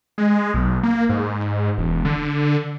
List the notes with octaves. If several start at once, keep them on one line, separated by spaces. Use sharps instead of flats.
G#3
B1
A#3
G#2
E1
D3